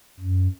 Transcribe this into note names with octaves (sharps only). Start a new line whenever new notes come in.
F#2